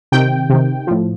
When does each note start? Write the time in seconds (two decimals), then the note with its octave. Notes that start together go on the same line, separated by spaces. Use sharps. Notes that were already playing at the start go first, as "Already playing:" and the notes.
0.12 C3 D#3 G5
0.50 C3 D#3
0.87 A2 F3